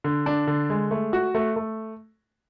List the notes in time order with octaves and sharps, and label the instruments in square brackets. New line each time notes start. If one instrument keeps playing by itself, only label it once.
[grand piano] D3
D4
D3
G#3
A3
F#4
A3
A3